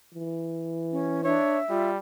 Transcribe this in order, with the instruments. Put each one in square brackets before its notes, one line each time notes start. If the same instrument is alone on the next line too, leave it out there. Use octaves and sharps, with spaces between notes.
[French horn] E3
[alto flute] C#4
[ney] D4 [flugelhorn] C#5 [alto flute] E5
[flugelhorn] G3 [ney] F4